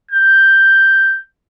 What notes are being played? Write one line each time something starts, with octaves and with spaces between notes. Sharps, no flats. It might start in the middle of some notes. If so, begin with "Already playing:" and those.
G6